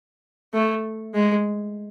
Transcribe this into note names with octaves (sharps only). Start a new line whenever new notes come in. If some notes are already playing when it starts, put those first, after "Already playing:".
A3
G#3